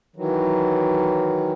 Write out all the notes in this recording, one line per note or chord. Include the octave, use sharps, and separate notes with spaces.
D#3 E3 F#3